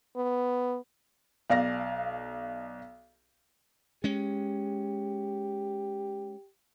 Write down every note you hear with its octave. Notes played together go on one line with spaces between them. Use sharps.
B3
B1 D5 F5 A#6
G#3 C#4 G4